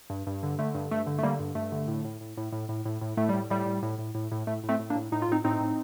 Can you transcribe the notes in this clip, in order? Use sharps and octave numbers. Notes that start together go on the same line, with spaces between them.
G2
G2
D3
D3 A3
G2
G2 A3
D3
A3
D3 G3 A#3
G2
G2 A3
D3
A2
A2
A2
A2
A2
A2
A2
A2
A2 A3
A2 G3
A2 G3
A2
A2
A2
A2
A2
A2 A3
A2
A3 C4
A2
A#3 D4
A2
A2 D#4
F4
A2 C4 D#4
A2 C4 D#4
A2